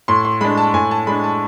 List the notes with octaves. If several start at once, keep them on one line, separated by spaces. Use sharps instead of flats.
A2 C6
C6
G#3 D4 B5
A5
A2 G#5
A5
G#3 D4 B5
A5